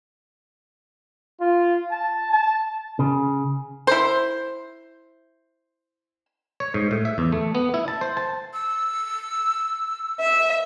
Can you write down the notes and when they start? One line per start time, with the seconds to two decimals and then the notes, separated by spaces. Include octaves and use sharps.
1.41 F4
1.91 A5
2.32 A5
2.99 C#3
3.87 E4 C5
6.60 C#5
6.74 G#2
6.91 A2
7.05 E5
7.18 E2
7.32 A3
7.55 B3
7.74 E4
7.88 A5
8.01 C5
8.17 A5
8.53 E6
10.20 E5